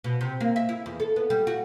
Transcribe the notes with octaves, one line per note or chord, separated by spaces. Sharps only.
B2
C3
A#3
E5
E4
E2
A4
B3
G3
F#4